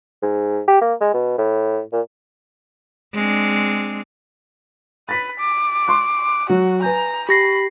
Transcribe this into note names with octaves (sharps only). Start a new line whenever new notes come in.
G#2
G4
A#3
G#3
B2
A2
A#2
G#3 C4 D4
B4 A6 B6
D6
C6 C#6 F#6
F#3 F#4
B4 G#5 A#5 G6
G4 B5 A#6 C7